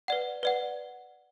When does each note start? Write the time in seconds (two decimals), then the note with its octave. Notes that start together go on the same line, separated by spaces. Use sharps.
0.08 B4 D5 F#5
0.43 B4 D5 F#5